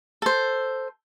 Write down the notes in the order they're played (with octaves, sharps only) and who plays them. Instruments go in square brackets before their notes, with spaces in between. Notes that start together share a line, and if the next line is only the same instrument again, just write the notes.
[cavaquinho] A4 C5